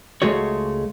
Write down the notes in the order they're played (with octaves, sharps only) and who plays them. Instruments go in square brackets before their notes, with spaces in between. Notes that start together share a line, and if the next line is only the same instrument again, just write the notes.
[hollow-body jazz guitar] C#2 A#2 G#3 A3 F#4 C#5